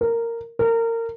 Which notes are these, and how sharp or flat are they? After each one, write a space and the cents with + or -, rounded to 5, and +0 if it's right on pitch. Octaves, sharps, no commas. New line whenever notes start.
A#4 -10
A#4 -25